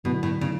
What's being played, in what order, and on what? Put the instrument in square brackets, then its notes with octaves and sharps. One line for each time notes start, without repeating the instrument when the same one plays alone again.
[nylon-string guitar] B2 [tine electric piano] D3 F#3 A3 E4
[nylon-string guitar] A2
C#3